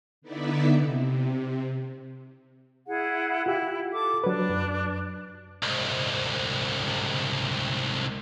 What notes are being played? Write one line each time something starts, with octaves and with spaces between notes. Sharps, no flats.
D3 B3 D#4 E4 D5 E5
C3
E4 G#4 F#5
E4 F4 G4
A4 D6
F#3 D4 B4
F#2
C2 G#2